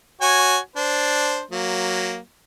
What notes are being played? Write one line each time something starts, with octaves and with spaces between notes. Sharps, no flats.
F#4 C#5 G#5
D4 C5
F#3 A#3